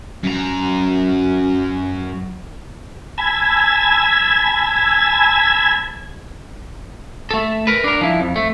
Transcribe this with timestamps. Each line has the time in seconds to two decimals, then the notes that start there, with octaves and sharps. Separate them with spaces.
0.23 F#2 A#5
3.18 G#5 A5 B5 E6 G#6
7.31 A3 A4
7.67 A#4 B4
7.84 D4 A#4
8.01 F3 E4
8.20 F2
8.36 A3